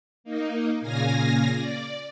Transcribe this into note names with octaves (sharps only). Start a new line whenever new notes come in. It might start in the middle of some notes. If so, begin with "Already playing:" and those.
A#3 D#4
A#2 C#3 F5 G#5 A#6
D5